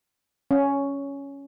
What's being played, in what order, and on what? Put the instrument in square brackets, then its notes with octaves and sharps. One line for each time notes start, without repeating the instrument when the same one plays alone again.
[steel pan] C#4